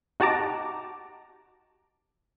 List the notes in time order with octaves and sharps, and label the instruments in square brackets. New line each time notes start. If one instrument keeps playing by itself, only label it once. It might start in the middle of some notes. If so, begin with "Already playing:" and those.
[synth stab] D#4 F#4 G4 A5 A#5 D6